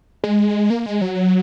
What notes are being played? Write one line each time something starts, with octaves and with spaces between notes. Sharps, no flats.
G#3
A#3
G#3
F#3